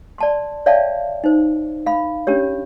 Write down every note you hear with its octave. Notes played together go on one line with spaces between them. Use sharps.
D5 A5 C6
C#5 D5 E5 F5 G5 A5
D#4 C5
F5 B5
C#4 D4 G4 C#5